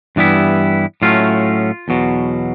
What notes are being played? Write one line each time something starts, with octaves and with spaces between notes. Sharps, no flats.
G2 E3 G3 B3 E4
A2 F#3 A3 C#4 F4
E2 B2 F#3